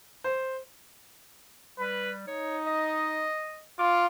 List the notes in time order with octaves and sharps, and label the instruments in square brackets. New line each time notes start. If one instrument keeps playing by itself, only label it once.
[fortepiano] C5
[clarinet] G3 [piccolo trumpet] B4
[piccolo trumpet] D#4 [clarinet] C#5
[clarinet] D#5
[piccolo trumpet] F4 [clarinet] D6